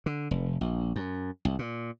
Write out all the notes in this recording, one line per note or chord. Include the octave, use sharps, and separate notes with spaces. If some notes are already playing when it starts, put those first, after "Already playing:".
D3
F1
A#1
F#2
C2
A#2